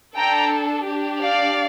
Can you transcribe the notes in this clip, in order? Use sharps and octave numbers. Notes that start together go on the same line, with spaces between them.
D4 A4 G5 A#5
D4 G4
D5 F5